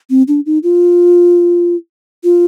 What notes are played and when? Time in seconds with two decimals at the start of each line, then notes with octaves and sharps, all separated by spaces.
0.10 C4
0.28 D4
0.46 D#4
0.63 F4
2.24 F4